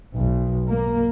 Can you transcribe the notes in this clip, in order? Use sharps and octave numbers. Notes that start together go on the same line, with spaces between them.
B1
A#3